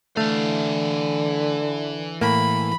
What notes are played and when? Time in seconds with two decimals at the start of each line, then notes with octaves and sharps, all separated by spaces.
0.17 D3 E3 A3 F5
2.21 A2 A#3 B5